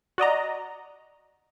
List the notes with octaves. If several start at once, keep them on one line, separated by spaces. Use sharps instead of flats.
F#4 D5 D#5 A#5